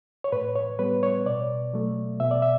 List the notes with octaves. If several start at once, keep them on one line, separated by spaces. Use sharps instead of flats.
C#5
A2 B4
C#5
G3 B3 B4
C#5
B2 D5
F#3 A3
B2 E5
D5
E5